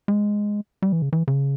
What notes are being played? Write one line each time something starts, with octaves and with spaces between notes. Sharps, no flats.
G#3
G3
E3
C#3
E3
C#3